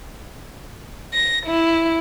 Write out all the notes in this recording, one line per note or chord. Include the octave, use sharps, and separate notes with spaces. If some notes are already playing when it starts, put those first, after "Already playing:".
A#6
E4